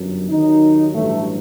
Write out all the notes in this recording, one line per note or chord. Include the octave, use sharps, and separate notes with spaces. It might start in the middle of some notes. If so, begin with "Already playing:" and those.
Already playing: G1 F#2 F#3
D#2 D#3 F#3 D#4
A1 G2 F#3 A3